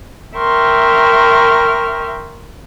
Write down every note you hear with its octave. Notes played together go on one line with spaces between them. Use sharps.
A#4 E5 G5 C6 C#6 F6